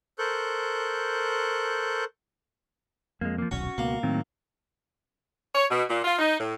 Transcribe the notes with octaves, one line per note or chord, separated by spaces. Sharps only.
A4 A#4 C5 C#6 F#6 G6
F2 G#3 A#3
F3 A#3
D#1 B1 C#4 F#4
C#2 B2 A#3
A2 D#3 F#3 C4
C#5
B2
A#2
F4
D#4
A2